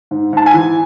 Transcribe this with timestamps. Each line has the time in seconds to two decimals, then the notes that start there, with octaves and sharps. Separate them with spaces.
0.11 G#2
0.33 G#2 A5
0.46 G#5
0.54 E3